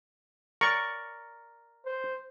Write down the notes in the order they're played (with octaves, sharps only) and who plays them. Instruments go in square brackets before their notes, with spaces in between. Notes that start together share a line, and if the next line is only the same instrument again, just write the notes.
[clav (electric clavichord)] A#4 D5 [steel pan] C#6
[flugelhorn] C5